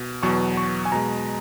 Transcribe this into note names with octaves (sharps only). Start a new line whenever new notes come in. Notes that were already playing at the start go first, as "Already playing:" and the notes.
Already playing: B2
E2 B2 F#3 C#6
C#6
G#5
B2 G#3 A#5